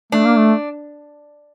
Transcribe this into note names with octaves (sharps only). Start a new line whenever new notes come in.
A3 D4
A#3
A3